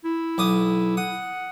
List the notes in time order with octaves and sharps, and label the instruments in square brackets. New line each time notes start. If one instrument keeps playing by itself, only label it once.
[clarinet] E4
[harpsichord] B1 D6 D#6
[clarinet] F#5 [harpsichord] D#6